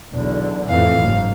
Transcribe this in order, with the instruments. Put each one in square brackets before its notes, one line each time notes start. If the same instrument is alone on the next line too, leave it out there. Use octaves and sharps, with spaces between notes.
[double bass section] B1 E2 D3
[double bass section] F2 A2 E3 [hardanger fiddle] F5
[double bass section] F#1 G#2